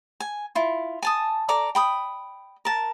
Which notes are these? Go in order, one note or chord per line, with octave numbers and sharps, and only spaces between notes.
G#5
E4 F4
G#5 A5 D#6
A4 D5 A#5 D6
G5 B5 D#6
A#4 A5